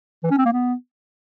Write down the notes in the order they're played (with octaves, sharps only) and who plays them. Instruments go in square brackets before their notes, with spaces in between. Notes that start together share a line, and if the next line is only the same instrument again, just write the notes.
[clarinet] E3
C#4
C4
A#3
B3